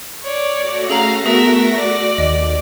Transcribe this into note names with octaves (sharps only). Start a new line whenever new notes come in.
C#5 D5
A3 F#4 A#6
C#4 G#4 A4 F5 A#5
B3 G#4 A#4 E5
D5
D#2 D#5